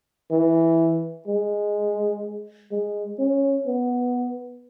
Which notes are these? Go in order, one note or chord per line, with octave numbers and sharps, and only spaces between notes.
E3
G#3
G#3
C#4
B3